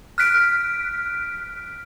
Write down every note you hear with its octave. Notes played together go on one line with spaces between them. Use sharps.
F6 F#6 B6 D7